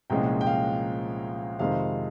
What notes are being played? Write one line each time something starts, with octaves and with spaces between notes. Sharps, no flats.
C2 A#2 F3 G#3 C#4 G5
G5
F5
F2 C3 D#3 G#3 F5